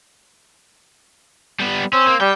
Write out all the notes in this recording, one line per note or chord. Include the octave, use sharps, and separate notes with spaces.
G3 B3
C4 C#4
A#3
G3 G5